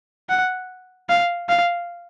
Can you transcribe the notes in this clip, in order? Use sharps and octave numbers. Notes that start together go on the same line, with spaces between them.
F#5
F5
F5